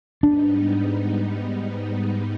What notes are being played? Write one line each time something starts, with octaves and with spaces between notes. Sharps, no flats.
G#2 G3 B3 D4 D#4